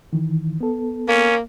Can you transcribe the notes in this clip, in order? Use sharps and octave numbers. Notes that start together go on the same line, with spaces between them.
D#3 E3
B3 A4
A#3 C#4